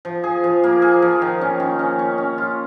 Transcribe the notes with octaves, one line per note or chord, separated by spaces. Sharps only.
F3
G#4
F3
A#3
G#4
F3
D#3
C#4
D#3
C#4
C#4
C#4
F4